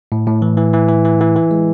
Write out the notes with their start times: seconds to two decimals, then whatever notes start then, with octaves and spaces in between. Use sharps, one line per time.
0.12 A2
0.27 A2
0.42 E3
0.57 E3
0.73 E3
0.89 E3
1.05 E3
1.21 E3
1.36 E3
1.51 G#3